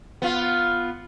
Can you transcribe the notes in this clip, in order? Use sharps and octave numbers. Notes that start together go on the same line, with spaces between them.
B3 F4